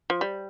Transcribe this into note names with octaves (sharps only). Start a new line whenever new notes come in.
F3
G3